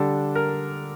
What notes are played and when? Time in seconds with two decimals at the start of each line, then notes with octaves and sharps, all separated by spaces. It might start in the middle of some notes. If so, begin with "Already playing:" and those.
Already playing: D3 G3 D4 A4
0.35 A#4